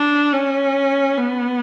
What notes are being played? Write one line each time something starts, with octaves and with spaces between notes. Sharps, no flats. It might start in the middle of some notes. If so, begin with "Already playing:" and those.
Already playing: D4
C#4
B3